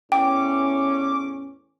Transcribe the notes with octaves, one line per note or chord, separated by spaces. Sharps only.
E2 A2 C#4 G5 D6